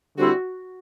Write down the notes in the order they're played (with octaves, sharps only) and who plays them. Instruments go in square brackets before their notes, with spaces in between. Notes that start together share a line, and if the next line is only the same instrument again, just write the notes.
[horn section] D3 G3 C4 E4 [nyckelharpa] F#4